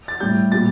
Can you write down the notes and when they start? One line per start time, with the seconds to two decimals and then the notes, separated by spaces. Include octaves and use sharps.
0.08 A6
0.20 A2 G3 G6
0.52 A#2 G3 A6